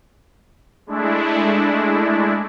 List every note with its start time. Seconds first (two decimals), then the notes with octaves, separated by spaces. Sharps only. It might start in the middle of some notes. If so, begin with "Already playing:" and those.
0.87 G#3 A3 D4 E4